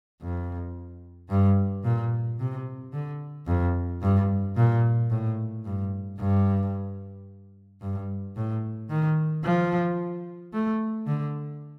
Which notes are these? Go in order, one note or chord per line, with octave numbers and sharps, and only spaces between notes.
F2
G2
A#2
C3
D3
F2
G2
A#2
A2
G2
G2
G2
A2
D#3
F3
A3
D3